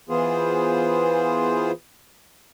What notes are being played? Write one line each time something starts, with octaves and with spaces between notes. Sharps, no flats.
E3 B3 F4 G#4 C5